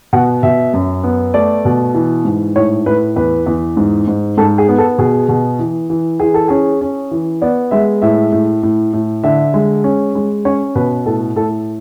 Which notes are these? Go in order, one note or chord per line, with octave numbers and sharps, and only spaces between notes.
B2 F#5
B2 E5
F#2
B3
A3 D5
B2
E3
G#2
A2 C#5
A2 B4
E2 B4
E2
G#2
G#2
G#2 A4
G#4
B3
A4
B2 G#4
B2
E3
E3
E3 G#4
A4
C#4 G#4
C#4
E3
B3 D5
G#3 E5
A2 E5
A2
A2
A2
D3 E5
G#3
C#4
G#3
C#4 C#5
B2 B4
A2 A4
A2 A4